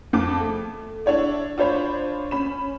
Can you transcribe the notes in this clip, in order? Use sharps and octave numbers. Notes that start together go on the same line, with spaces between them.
F2 A5 D6
A3
D4 E4 C#5 D5
D4 F4 C5 C#5 B5
C#4 B5 E7